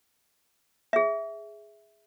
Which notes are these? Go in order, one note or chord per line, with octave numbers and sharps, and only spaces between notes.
G#4 E5